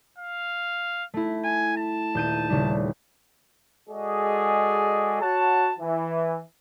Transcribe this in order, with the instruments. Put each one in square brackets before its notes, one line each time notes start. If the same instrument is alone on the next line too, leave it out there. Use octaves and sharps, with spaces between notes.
[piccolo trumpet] F5
[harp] A3 E4
[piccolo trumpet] G#5
A5
[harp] D#1 G6 D#7
D#1 C#3 G3
[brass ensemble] G#3 F#4 G#4 A4 D5 D#5
F#4 C#5 F#5 A5
E3